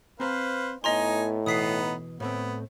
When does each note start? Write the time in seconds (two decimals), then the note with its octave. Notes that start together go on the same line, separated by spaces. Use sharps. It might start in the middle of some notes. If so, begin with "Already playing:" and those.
0.20 C4 B4 C5 F5 A#5
0.84 A2 B3 D#4 C#5 D#5 G#5 A#5 C6
1.46 B2 E3 B3 D#4 D#6 B6 C7
2.20 A2 A3 B3 C4